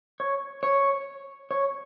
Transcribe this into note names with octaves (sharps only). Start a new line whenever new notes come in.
C#5
C#5
C#5